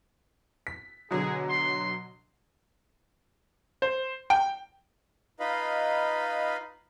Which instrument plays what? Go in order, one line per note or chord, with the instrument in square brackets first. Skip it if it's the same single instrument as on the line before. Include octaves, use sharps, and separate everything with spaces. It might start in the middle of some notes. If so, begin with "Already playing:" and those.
[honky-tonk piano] B6
[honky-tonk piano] B2 D3 F#3 [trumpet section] G#4
[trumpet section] C6
[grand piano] C5
G5
[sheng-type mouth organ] D#4 F4 B4 D#5 F5 B5